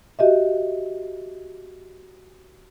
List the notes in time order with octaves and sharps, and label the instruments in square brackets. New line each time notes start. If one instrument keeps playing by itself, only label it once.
[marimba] F#4 G4 D#5 E5